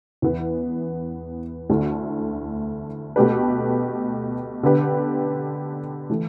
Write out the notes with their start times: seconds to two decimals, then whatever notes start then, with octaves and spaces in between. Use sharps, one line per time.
0.22 E2 E3 B3
1.70 D2 D3 A3 E4
3.16 B2 A3 G4 B4
4.63 D3 B3 G4 B4
6.10 E3 A3